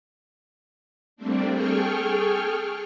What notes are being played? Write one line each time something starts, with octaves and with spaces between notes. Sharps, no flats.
G3 A3 A#3 C4 D4
G#4 A4 G5 C#6 F6